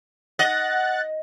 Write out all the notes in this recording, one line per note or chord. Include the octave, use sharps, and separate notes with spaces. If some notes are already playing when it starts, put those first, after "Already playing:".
D#5 F#5 F#6 A6